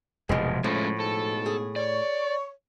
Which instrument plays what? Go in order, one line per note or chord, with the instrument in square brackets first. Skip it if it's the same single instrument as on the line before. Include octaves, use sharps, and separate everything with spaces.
[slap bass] F1 E2 G#2 [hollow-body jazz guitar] B2 G#3
[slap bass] A2 [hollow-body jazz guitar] F3 [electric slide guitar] G#3 A3 C#4
[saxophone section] G#2 B2 [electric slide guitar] A4
[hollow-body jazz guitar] G#4
[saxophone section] C#5 [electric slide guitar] D5